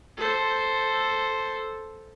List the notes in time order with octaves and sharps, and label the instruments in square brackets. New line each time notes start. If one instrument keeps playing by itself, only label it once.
[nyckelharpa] A4 C5